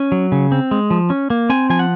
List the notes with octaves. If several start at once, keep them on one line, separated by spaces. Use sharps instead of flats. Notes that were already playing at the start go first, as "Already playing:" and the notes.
Already playing: C#4
F#3
C#3
C4
G#3
F3
C#4
A#3
C4 G#5
F3 G#5
F#5